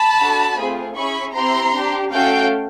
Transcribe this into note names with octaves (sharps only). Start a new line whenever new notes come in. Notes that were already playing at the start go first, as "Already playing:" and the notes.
Already playing: A5 B5
D4 F#4 A4
A3 C4 F4 G#4
C#4 E4 G#4 B5 C#6
C4 E4 G4 A#5 C6
D4 G4
A3 C#4 F#4 A4 F5 G5